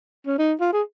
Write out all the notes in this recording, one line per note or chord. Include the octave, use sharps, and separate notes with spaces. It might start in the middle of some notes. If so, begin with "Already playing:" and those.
C#4
D#4
F4
G#4